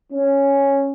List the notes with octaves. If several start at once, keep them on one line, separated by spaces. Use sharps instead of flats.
C#4